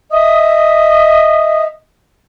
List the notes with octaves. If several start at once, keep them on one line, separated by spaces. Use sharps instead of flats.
D#5 E5 D#6